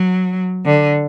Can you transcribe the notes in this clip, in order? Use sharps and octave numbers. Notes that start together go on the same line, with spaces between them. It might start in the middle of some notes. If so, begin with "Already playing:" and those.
Already playing: F#3
D3